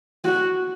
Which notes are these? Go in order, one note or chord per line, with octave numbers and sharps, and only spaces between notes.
F#4